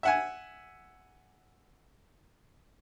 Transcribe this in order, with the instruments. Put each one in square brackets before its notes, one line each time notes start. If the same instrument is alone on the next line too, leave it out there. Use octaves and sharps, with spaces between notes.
[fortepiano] E5 F#5 G#5